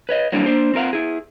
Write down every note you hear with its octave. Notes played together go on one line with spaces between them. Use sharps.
B4 C#5 D#5
F#3 G3 A#3 C4 D4 E4
A#3 D4 C5
C4 F4 A#4 F5 F#5
E4 G#4